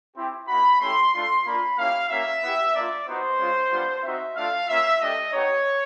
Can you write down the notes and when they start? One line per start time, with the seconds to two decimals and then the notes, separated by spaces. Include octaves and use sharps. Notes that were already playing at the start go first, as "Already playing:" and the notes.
0.16 C4 E4 G4
0.48 A#3 D#4 F#4 B5
0.81 A3 C#4 E4 G4 C6
1.13 A3 D4 F4 C6
1.45 A#3 D4 F4 B5
1.78 A#3 C#4 E4 G4 F5
2.09 A#3 C#4 F#4 E5
2.42 B3 E4 G4
2.74 A#3 D4 F4 D5
3.07 B3 D#4 F#4 C5
3.39 G#3 C#4 F4
3.71 G3 B3 D4 F4
4.03 C4 D#4 F#4 E5
4.36 A3 D4 F4 F5
4.68 A#3 C#4 F4 E5
5.01 A3 D4 G4 D#5
5.33 B3 D#4 G4 C#5